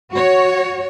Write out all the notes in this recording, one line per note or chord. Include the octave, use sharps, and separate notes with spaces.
F#4 C#5